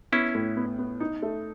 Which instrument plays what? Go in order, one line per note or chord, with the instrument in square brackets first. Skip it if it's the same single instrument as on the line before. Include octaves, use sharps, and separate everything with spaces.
[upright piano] B3 [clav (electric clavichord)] C#4 E4
[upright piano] A2
B3
B3
D#4
A3